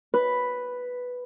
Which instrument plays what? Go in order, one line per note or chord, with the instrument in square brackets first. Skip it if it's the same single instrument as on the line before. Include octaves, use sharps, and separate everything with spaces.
[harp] B4